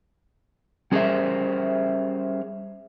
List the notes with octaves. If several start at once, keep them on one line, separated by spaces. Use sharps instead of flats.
G3 C#4 G#4 A#4 C5 E5